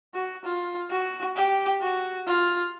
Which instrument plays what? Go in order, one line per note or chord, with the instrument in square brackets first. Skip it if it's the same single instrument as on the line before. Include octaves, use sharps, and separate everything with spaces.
[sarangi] F#4
F4
F#4
G4
F#4
F4